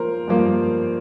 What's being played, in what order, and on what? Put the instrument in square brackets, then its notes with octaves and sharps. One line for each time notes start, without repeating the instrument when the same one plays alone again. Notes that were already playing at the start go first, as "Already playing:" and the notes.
Already playing: [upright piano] F3 A#3 A#4 C5
G2 F3 A#3